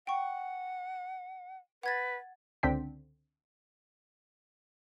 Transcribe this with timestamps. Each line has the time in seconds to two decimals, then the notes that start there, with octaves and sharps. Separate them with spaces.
0.07 F#5 G5 C#6
1.83 B4 F#5 G#6 A6
2.63 C#2 D3 C4 D4 G5 B6